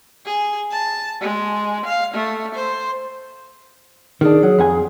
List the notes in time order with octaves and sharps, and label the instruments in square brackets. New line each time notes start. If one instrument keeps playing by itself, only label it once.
[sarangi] G#4
A5
G#3
F5
A3
C5
[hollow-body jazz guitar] D#3 D4 [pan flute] G#4
[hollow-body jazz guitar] F#3
F2 F#5 G#5